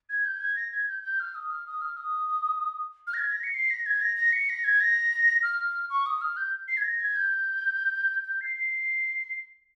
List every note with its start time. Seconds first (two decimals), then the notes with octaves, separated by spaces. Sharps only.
0.09 G#6
0.25 G6
0.41 G#6
0.56 A#6
0.72 G#6
0.88 G6
1.03 G6
1.20 F6
1.35 D#6
1.50 F6
1.67 D#6
1.81 F6
1.97 D#6
3.07 F6
3.14 A#6
3.19 G#6
3.31 A#6
3.43 C#7
3.54 C7
3.70 A#6
3.86 G#6
4.01 A#6
4.17 A#6
4.33 C#7
4.49 A#6
4.64 G#6
4.80 A#6
5.43 F6
5.90 C#6
6.06 D#6
6.21 F6
6.37 G6
6.68 C7
6.77 G#6
6.84 A#6
7.01 G#6
7.16 G6
8.25 G6
8.41 C7
8.56 C7